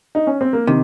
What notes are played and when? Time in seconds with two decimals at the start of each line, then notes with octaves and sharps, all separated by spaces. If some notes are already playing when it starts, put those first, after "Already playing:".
0.15 D#4
0.27 C#4
0.41 C4
0.53 A#3
0.67 C3 D#3